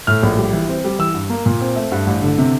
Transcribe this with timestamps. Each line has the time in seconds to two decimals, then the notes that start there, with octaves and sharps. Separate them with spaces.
0.07 A2 F6
0.23 A#1
0.37 G3
0.53 E3
0.68 C4
0.84 G3
0.99 E3 E6
1.14 G2
1.30 A#3
1.46 A#2
1.61 C4
1.76 A3
1.92 G2
2.07 A1
2.22 D3
2.38 C3